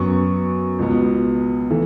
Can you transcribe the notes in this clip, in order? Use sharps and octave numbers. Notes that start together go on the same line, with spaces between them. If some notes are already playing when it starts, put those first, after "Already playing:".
Already playing: F#2 F#3 B3 C#6
C#2 B2 B3
E3 A3